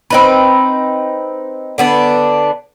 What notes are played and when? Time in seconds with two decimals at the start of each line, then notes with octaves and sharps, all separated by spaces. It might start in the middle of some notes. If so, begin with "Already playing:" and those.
0.10 C4 D#4 B4
1.78 D3 B3 D4